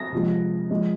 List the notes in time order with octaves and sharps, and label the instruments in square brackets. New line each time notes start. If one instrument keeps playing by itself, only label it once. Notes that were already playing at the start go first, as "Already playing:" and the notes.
Already playing: [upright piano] A#6
C3 F3 G#3
F3 G#3